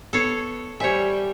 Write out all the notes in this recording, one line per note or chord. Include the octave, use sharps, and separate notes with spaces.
B3 A4 C#5 C7
G3 C5 C#5 E5 G#5